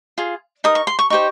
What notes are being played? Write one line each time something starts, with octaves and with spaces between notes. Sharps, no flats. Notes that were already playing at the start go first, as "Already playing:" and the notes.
F4 G#4
D#4 A#4 D#6
C#6
C6
C#6
D#4 G4 C5 C#6